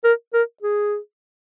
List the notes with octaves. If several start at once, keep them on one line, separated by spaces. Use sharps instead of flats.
A#4
A#4
G#4